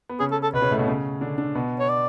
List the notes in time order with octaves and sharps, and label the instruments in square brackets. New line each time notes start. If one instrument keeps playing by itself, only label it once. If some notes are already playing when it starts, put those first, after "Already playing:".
[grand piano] B3
[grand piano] C#3 C#4 [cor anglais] G#4
[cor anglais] A4
A4
[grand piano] B2 B3 [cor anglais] B4
[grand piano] C#3 C#4
A2 A3
B2 B3
C#3 C#4
D3 D4
D3 D4
B2 B3
[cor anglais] C#5
D5